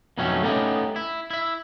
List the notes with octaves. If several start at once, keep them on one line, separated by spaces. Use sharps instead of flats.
F2 B2 D#3 F#3 A3 C#4
A3 B3 C#4 D#4 G4
E4
E4 E5